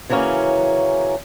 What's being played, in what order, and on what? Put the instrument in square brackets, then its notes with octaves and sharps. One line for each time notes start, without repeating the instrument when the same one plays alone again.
[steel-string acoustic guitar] C#3 E3 F#3 A#3 C#4